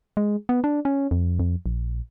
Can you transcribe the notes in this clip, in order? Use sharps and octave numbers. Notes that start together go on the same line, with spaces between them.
G#3
B3
D4
C#4
F2
F2
A#1